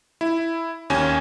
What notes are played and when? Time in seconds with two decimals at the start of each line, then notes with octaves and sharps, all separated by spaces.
0.21 E4
0.90 D#2 C#4 G#5